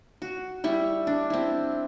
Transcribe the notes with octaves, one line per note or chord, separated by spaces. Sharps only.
F#4
G3 E4 C#6
D4
C4 E4